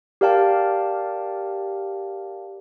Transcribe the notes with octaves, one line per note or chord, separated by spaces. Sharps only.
G4 A#4 D5 F5 G5 A5